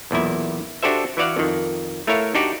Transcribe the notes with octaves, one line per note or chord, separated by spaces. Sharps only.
B1 E2 A#2 E4
D4 F#4 G4 A4 C5 E5
E3 E4 F#4 D5 F5 F#5
F2 D#3
A3 E4 A#4 C#5 F5
D4 D#4 F#4 G4 D5